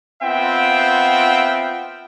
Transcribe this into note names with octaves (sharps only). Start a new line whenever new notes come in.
B3 C4 F4 E5 F#5 G5